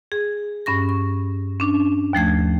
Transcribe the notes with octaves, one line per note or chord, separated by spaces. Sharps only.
G#4
G2 C#4 C#6 A#6
C#6
C#4 D4
D#2 F3 A3 G#6